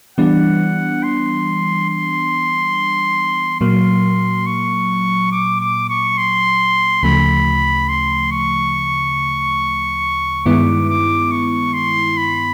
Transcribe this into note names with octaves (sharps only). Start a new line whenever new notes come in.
E3 G3 B3 D4 F#5
C6
C6
A#2 F#3 A#3 C6
C#6
D6
D6
C#6
C6
D2 C#3 F3 A3 B5
C6
C#6
G2 D#3 G#3 B3 E4 D6
D6
C#6
C6
B5